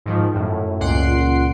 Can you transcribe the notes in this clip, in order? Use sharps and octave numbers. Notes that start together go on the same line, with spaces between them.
G#2 D#3 F3
F#2 A2
C#2 A#2 F#5 C6 C7 D7